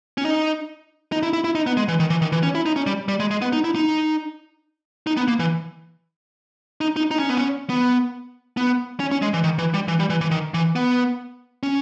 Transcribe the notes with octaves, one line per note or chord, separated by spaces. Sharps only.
C#4
D#4
D#4
E4
E4
E4
D#4
B3
G#3
E3
D#3
E3
D#3
E3
C#4
E4
D#4
C#4
G3
G3
G#3
G#3
B3
D#4
E4
D#4
D#4
B3
A#3
E3
D#4
D#4
D#4
C#4
B3
C#4
B3
B3
C#4
C#4
G#3
E3
D#3
E3
G3
E3
G3
E3
E3
D#3
E3
B3
C#4